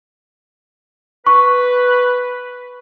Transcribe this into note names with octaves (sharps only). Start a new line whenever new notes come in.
B4 C#6